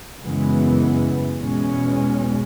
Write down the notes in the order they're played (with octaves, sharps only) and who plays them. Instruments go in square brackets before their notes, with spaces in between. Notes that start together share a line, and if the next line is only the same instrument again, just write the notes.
[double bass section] F#2 C#3 E3 G#3 B3
E2 B2 G#3 C#4